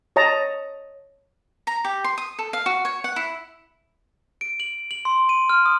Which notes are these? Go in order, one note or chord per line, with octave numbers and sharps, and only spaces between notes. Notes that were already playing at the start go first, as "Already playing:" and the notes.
C#5 D#5 A5 A#5
A#5
G4
C6
D#6
A4
F5
F#4
C#5
F#5
E4
D7
F#7
F#7
C6
D#7
F6
D#6